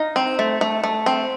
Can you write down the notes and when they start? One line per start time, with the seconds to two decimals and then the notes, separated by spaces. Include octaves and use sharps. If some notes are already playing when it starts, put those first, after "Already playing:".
Already playing: D#4 F5
0.16 C4
0.39 A3
0.61 A3
0.84 A3
1.06 C4